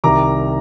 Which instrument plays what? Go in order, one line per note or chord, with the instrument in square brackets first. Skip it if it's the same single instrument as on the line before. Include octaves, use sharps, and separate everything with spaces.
[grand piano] C2 C3 D#3 A#5 D6